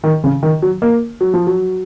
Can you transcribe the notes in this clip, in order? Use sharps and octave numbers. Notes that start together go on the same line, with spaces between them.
D#3
C#3
D#3
F#3
A#3
F#3
F3
F#3